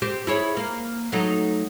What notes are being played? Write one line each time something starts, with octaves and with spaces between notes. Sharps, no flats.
C4 G4 C5
E4 G#4 C#5
A#3
F#3 A3 D#4